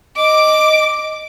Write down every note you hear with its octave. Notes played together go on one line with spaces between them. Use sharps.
D#5 D6